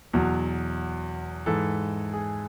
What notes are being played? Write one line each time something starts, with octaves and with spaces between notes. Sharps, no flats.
E2 B2 F#3
G#2 E3 A4
G#4